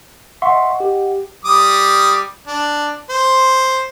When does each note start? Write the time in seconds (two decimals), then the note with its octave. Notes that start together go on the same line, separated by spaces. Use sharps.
0.42 D#5 E5 F#5 C6 C#6
0.80 G4
1.45 G3 D6 D#6
2.47 D4
3.10 C5